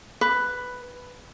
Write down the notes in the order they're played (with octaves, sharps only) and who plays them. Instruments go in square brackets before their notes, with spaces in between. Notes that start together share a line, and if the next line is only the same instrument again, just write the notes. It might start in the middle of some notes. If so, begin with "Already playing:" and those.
[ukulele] B4